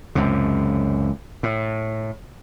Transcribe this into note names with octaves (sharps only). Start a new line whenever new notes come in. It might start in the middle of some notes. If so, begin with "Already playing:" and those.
C#2 F#2 C3
A2